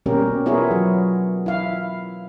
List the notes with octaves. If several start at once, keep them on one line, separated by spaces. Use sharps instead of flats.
B2 G3 A#3 C#4 G4 A#4
B3 E4 F4 G#4 A#4 C#5
F#3
E4 F5